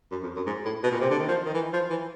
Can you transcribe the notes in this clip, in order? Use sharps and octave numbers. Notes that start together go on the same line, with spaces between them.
F#2
F2
F#2
G#2
A2
B2
A#2
C3
D3
D#3
F3
D#3
E3
F3
E3